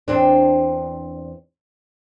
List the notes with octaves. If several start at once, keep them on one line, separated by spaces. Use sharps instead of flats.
E2 C4 D4